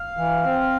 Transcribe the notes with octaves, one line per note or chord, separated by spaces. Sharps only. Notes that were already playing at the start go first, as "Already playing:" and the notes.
Already playing: F5
E3
C4